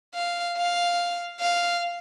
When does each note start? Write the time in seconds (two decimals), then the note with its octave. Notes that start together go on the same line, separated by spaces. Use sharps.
0.15 F5
0.57 F5
1.40 F5